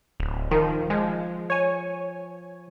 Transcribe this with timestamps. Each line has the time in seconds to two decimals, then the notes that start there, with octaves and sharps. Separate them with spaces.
0.20 D1
0.51 D#3 F3
0.90 F3 G#3
1.50 C#5 G#5